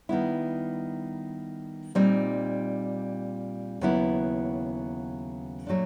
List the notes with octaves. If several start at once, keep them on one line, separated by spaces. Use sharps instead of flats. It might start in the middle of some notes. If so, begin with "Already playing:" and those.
D#3 G3 B3 E4
A#2 G3 C4 D#4
D#2 C#3 F#3 B3 E4
A#2 F#3 A3 D4